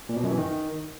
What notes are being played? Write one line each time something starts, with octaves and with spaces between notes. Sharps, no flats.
A#2
B2
F#2
E3
D#3